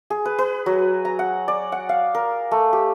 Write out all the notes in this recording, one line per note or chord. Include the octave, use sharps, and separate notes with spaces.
G#4
B4
B4
F#3
A#5
F#5
D5
F#5
F5
A#4
A3
G4